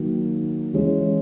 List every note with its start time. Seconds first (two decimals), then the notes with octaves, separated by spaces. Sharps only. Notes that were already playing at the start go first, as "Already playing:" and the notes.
Already playing: D#3 F#3 A#3
0.74 E3 G#3 C#4